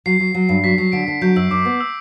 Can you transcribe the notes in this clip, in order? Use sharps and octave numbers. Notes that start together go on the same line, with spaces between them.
F#3 C7
F#3
F#3
G2
F#3 B6
F#3 C7
D3 D7
D3 C7
F#3 G6
F#2 E6
F#2 D6
B3
E6